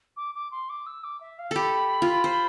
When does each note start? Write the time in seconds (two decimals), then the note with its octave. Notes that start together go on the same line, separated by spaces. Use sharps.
0.16 D6
0.34 D6
0.51 C6
0.69 D6
0.86 E6
1.03 D6
1.20 E5
1.38 F5
1.51 G4 A4 B5
2.02 F4
2.24 C5